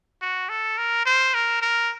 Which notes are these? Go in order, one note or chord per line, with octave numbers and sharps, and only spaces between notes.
F#4
A4
A#4
C5
A#4
A#4